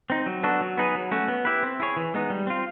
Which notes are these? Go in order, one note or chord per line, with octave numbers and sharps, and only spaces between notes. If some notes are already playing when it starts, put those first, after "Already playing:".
C4 D#4
F#3
B3 D4 F#4 A4
F#3
B3 D#4 G#4 B4
F#3
A3 C#4 F#4
B3
E4 G4 B4
C4
E4 G#4 C#5
E3
G#3 B3 D#4
G3
C4 F4